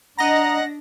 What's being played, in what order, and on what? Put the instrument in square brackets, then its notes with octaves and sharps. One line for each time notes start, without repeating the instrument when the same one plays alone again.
[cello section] D4 [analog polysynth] D#5 A#6 [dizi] F#5 [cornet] A#5